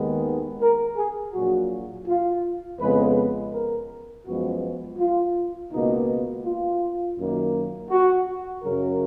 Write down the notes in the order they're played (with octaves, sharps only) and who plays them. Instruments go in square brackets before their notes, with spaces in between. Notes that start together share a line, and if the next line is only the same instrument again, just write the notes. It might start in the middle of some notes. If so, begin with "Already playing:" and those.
Already playing: [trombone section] D#2 D#3 G#3 B3
A#4
G#4
A#1 A#2 F#3 F#4
F4
F2 C#3 G#3 B3 B4
A#4
F#2 F3 G#3 B3 F#4
F4
C#2 B2 A#3 D#4
F4
F#2 D#3 A#3
F#4
F#2 C#3 F#3 A#4